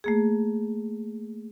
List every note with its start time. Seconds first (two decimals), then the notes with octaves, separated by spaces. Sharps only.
0.04 A3 A#3 G#4